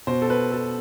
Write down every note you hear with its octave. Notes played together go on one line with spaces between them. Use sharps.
B2 C5
A4
B4
A4